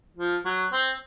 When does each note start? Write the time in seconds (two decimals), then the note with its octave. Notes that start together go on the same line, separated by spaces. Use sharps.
0.17 F3
0.45 F#3
0.73 C4